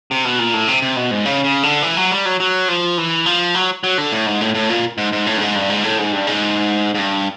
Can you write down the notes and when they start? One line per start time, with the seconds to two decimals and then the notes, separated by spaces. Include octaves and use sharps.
0.11 C3
0.25 B2
0.39 A#2
0.54 A2
0.68 C3
0.82 C3
0.96 B2
1.11 G#2
1.25 C#3
1.44 C#3
1.63 D3
1.82 E3
1.97 F#3
2.11 G3
2.25 F#3
2.40 F#3
2.68 F3
2.98 E3
3.26 F3
3.55 F#3
3.84 F#3
3.98 D3
4.12 A2
4.26 G#2
4.41 A2
4.55 A2
4.69 A#2
4.98 G#2
5.12 G#2
5.26 A2
5.37 G2
5.41 G#2
5.55 G2
5.70 G#2
5.84 A2
5.98 G#2
6.13 G2
6.27 G#2
6.95 G#2
6.98 G2